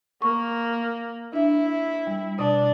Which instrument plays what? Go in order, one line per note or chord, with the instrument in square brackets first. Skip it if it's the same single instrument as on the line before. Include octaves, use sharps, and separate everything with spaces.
[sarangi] A#3 [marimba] C#6
[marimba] D4 E5 [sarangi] E4
[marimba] G3
[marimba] B2 [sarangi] D4